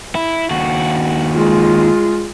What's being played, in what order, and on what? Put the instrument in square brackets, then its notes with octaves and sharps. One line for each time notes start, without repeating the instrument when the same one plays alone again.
[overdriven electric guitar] E4
D#2 F#4
[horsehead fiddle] G#3 F4